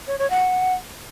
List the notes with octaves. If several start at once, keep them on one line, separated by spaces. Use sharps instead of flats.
C#5
C#5
F#5